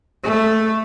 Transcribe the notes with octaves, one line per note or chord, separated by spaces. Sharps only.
A3